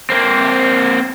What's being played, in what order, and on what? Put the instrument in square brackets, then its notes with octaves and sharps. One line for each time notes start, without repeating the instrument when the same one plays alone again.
[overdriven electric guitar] A#3 C4